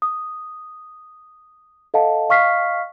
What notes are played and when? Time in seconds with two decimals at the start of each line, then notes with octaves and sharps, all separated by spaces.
0.02 D#6
1.94 A4 D#5 F5 F#5 A5
2.29 D#5 F5 C#6 F6 B6 C7